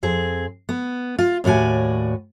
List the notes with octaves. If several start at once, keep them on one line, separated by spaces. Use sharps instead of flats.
F2 C4 G#4
B3
F4
D#2 A2 F#4 D5 G#5